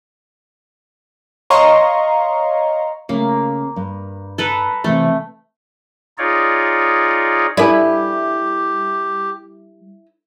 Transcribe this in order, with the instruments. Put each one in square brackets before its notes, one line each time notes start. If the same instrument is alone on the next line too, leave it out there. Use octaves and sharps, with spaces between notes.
[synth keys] C#5 D#5 F5 A#5 C6 C#6
[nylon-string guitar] C#3 A3 [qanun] A#3
[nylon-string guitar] G2
[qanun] A4 B4 A#5
[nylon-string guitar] C3 E3 [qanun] A3
[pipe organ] D#4 F4 G#4 C#5 D5
[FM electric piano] G3 [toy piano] D4 A4 D5 [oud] E4 B4 [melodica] G4